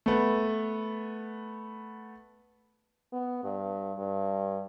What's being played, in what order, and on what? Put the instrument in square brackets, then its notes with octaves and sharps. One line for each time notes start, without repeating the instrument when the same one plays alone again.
[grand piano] A3 B3
[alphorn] B3
G2
G2